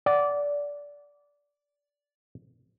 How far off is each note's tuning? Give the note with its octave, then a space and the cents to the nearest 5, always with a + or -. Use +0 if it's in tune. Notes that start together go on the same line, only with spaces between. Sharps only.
D5 -15 F#5 +0